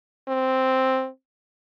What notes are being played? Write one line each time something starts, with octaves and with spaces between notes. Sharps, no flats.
C4